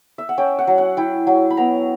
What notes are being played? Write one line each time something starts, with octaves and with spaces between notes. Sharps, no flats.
E5
F#5
C#4 G5
F#5
F#3
F#5
E4 G5
F#3
B5
B3 A#5